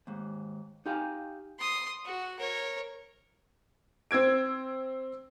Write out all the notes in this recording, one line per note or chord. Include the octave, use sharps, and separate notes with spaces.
D#2 G#2
D#4 G4 F5 G#5
C6 D#6
F#4
A#4 C#5
C4 E6 G#6 D7